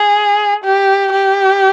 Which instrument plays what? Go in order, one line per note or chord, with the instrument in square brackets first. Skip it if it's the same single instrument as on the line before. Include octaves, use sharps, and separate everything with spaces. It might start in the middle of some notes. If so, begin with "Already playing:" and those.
Already playing: [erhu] G#4
G4
G4